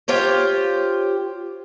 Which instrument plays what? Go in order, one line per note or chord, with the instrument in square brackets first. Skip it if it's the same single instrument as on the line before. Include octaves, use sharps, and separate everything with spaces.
[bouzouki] F4 G4 C5 C#5